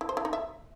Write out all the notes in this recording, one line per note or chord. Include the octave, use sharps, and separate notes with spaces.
E4
C5
E4
D#4
E5